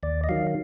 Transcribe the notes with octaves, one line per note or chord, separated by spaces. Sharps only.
D#2 D5
D#5
D#3 F#3 F5